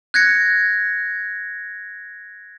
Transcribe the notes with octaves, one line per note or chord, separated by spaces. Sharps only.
F#6 G#6 A#6 C#7